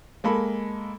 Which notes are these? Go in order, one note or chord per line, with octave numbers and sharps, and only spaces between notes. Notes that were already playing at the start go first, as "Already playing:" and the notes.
G#3 A#3 A4 B5